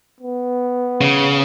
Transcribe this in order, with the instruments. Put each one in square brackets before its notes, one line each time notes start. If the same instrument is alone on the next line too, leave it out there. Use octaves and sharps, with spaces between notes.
[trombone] B3
[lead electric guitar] C#3